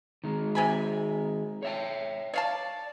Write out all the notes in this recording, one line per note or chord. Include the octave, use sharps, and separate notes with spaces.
D#3 G#3
C3 G#5 B5
C#5 E5 G5
C#5 D5 F5 A5